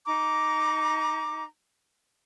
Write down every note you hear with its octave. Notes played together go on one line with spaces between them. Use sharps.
D#4 A#5 D6